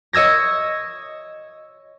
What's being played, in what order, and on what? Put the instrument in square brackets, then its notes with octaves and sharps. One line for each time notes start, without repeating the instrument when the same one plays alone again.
[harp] C#5 D#5 E6 G#6 A#6